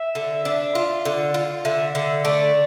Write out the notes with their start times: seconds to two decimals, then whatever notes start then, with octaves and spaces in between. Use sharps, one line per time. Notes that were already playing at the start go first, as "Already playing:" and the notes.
Already playing: E5
0.15 D3
0.45 D4
0.75 F4
1.05 D3
1.34 F4
1.65 D3 E5
1.95 D3
2.24 A3 D5